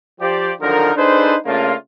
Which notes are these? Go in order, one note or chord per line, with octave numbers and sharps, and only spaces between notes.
F3 G4 C5 D5
D3 D#3 F3 F#3 D#4 A#4
D4 D#4 G#4 A4 B4 C5
C#3 A3 A#3 D4 F4